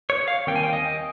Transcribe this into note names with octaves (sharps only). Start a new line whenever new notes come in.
C#5
F5
D#2 D#3 G3 C4 G5
G#5
G5
D#5